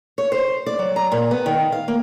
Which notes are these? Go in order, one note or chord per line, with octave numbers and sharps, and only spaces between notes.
C#5
C5
D5
F#3
A#5
A#2
B3
D#3
F5
A#3